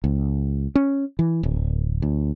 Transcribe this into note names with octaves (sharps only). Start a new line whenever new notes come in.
C#2
C#4
E3
D1
D2